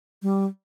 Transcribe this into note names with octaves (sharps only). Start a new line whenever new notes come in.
G3